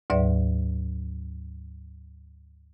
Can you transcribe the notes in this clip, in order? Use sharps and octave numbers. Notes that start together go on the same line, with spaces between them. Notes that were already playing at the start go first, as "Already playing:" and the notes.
D2 G#2 F#3 B4 D5 E5